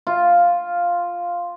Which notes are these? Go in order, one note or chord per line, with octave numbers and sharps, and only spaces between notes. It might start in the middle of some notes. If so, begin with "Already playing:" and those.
F4